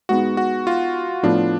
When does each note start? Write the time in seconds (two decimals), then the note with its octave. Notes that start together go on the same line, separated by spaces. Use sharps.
0.09 G#2 G#3 B3 F#4
0.37 F#4
0.67 F4
1.23 A2 F3 B3 D4 F4